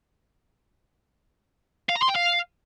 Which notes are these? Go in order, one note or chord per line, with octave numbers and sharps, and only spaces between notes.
F5
A#5
C6
G5
F5